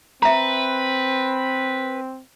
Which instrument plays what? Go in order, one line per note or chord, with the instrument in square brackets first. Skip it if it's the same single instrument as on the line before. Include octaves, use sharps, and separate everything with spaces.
[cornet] C4 [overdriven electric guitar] B4 [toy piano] E5 A#5